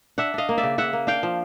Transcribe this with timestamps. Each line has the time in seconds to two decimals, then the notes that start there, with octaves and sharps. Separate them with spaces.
0.18 D4 E5 F#5
0.34 D4 D#5 F5
0.49 A#3
0.58 D5 E5
0.63 C#3
0.78 C#3 E5 F#5
0.93 A#3
1.07 D4 F5 G5
1.23 F3